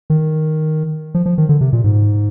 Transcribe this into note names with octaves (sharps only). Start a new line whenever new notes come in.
D#3
F3
F3
D#3
D3
C3
A#2
G#2